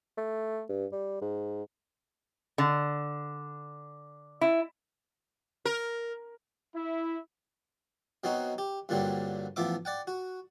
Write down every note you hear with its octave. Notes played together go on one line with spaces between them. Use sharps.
A3
G2
G3
G#2
D3
E4
A#4
E4
B2 F#3 C4 D#4 F#4
G4
G2 A#2 D3 F#3 G3 C4
A1 F3 B3 E5 D6
D5 F#5 G5
F#4